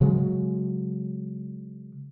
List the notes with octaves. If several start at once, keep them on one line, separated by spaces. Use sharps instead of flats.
C#3 F#3 G#3